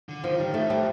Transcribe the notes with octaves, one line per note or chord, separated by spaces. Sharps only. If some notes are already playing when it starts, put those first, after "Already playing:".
D3
D#3 F3
G3
F2 A3
G3